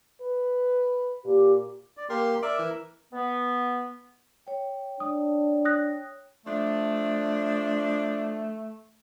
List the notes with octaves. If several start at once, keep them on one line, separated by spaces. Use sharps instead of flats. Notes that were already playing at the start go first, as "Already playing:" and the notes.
B4
A#2 G4
D5
A#3 G4 A#4 C6
A#4 D5 E5
E3
B3
C#5 G5
D4 D#6
D#6 F#6 A#6
F3 A3 D4